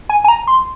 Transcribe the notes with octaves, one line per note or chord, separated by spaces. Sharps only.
G#5
G#5
A#5
C6